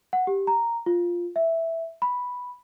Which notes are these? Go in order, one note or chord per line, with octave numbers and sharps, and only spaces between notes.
F#5
G4
A#5
F4
E5
B5